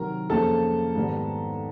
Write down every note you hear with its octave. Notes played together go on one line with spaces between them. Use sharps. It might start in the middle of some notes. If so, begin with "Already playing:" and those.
Already playing: C3 D#3 F#3 A#4 A#5
F2 C#3 F3 A#3 A4 A5
G#2 D#3 G3 B3